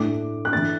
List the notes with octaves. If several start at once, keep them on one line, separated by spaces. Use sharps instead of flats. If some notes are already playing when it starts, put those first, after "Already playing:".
Already playing: A2 A3 D4 D6
F#6
E3 A3 D4 A6